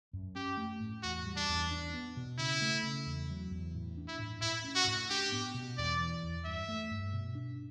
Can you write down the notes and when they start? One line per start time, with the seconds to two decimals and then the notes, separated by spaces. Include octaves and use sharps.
0.13 F#2
0.36 C#4 G4
0.57 A3
0.80 A2
1.03 E2 F#4
1.25 G3
1.36 D4
1.49 E2
1.71 D4
1.94 B3
2.17 B2
2.38 C#3 E4
2.62 A3
2.83 C#3
3.06 E2
3.30 F#3
3.51 E2
3.74 A2
3.97 D4
4.08 E4
4.19 A2
4.42 A2 E4
4.64 C#4
4.75 F#4
4.87 A2
5.10 D4 G4
5.32 B3
5.54 B2
5.78 E2 D5
6.00 E3
6.23 E2
6.45 G2 E5
6.68 A3
6.91 G2
7.13 B2
7.35 D4